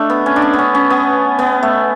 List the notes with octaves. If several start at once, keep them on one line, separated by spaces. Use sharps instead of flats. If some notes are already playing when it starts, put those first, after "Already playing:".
Already playing: A3 D4
B3
C#4
D4
C#4
B3
C#4
C#4
B3
B3
A3